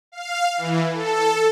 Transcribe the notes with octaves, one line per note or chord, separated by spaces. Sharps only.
F5
E3
A4